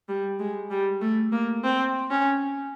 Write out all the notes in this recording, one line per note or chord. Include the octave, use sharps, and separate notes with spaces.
G3
G#3
G3
A3
A#3
C4
C#4